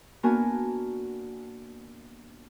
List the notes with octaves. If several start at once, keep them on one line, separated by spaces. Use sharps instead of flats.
A#3 B3 D4 F#4 A#4 G#5